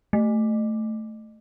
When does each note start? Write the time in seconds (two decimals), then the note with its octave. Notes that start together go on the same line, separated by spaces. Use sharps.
0.13 A3